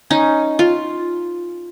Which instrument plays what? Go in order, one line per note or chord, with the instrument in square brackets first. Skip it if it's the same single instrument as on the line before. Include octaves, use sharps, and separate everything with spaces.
[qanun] C#4 D#4
F4